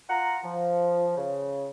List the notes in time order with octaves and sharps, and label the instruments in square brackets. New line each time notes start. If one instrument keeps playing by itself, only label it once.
[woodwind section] F4 F#5 A#5
F3
C#3